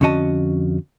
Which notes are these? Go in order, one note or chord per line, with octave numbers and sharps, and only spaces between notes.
F2 D3 C#4 F#4 D#5 A5